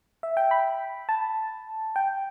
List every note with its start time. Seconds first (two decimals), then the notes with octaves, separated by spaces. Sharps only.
0.23 E5
0.37 G5
0.51 B5
1.09 A5
1.96 G5